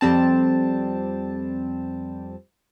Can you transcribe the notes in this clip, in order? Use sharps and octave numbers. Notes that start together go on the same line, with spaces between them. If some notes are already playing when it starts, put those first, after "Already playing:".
F2 G3 C4 A5